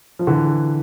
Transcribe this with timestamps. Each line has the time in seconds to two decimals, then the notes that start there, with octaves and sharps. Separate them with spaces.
0.19 F3
0.27 D3 E3